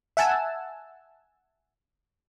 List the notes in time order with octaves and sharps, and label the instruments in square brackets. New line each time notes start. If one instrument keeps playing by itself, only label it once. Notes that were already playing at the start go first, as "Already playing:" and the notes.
[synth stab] E5 F#5 G#5 A5 E6